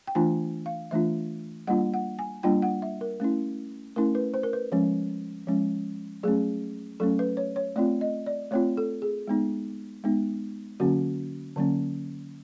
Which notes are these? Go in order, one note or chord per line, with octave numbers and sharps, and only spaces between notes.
G5
E3 A3 D4 F4 G#5
F5
E3 A3 D4 F4 E5
G3 A#3 D4 F4 F#5
F#5
G#5
G3 A#3 D4 F4 G5
F#5
E5
A#4
A3 C#4 E4
A3 C#4 E4 A#4
B4
C5
A#4
B4
F3 G#3 C#4
F3 G#3 C#4
F#3 A3 C#4 G#4
F#3 A3 C#4 A4
B4
C#5
C#5
A3 C4 F4 D5
D#5
D5
A3 C4 F4 C#5
A4
G#4
G#3 B3 D#4
G#3 B3 D#4
D3 F#3 A#3 C#4 F#4
D3 F#3 A#3 C#4